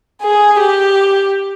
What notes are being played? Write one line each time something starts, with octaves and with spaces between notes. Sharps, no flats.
G#4
G4